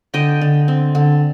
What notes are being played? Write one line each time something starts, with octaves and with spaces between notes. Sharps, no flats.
D3 D#5 G5
D3
C4
D3